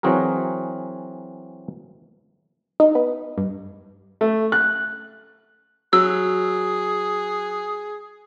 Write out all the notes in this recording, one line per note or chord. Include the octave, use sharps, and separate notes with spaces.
E3 F#3 C4 F#4 G#4 A#4
D#4
B3
G2
A3
F#6
F#3 G#4 E6